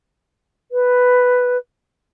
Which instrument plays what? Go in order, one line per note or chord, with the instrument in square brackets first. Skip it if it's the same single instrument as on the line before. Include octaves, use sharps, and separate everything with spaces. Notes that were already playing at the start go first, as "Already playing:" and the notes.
[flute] B4